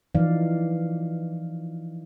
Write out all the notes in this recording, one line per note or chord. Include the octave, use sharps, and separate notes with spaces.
E3 F3 D#4 D5 F5